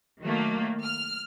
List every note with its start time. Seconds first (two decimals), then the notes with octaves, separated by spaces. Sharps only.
0.22 D#3 F#3 A3 A#3
0.84 F6